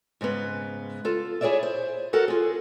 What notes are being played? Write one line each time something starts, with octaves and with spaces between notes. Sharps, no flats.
G#2 C#3 G#3 B3
F4 A4
E4 G#4 A#4 C#5 D5 E5
C5
F#4 A4 A#4 F#5
F4 G#4